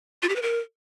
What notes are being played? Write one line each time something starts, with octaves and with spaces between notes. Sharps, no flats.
F4
G4
B4
A#4